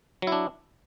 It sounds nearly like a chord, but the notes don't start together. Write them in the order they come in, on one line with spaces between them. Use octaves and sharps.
F#3 E4 D4